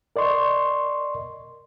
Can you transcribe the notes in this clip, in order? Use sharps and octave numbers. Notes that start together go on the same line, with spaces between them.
A#4 D5 D#5 C6 C#6